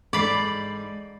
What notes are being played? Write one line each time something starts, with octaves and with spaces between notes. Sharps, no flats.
G#2 A4 D5 B5 C7